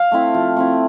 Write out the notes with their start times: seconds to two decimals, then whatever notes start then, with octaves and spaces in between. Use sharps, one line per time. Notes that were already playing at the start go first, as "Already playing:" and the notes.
Already playing: F5
0.12 A3 C4 E4
0.34 F3
0.57 A3 C4 E4